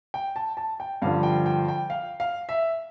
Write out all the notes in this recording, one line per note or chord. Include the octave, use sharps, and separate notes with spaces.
G5
A5
A5
G5
G2 D3 F3 F5
G5
G5
G5
F5
F5
E5